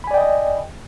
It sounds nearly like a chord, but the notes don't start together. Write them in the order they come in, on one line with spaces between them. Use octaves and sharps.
B5 G#5 D5 G5 D#5